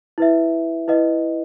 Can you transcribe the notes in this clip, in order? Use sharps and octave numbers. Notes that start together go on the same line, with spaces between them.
E4 B4 E5
E4 B4 D#5 F#5